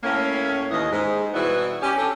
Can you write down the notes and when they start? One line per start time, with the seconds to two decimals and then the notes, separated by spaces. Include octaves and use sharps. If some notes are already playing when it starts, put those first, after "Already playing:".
0.04 A2 A#3 C#4
0.71 D#2 E3 D#5
0.92 G#2
1.34 B2 E3 G3 B3 E4 F#4
1.82 C#4 G4
1.98 C4 D4 G4 A4 C#5